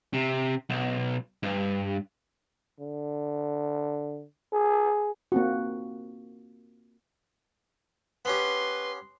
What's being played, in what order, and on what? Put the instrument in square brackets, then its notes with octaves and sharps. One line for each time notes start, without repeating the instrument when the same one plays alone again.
[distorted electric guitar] C3
B1
G2
[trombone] D3
G#4
[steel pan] A#3 C4 F#4
[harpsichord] B3 C#4 G4 [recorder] B4 [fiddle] C6